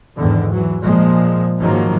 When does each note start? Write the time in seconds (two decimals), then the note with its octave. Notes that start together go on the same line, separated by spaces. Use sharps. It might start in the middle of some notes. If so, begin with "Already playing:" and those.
0.17 E2 G#2 D3 D#3
0.53 E3 F#3
0.83 A#2 F3 G#3
1.60 G#2 D#3 F3 F#3 A#3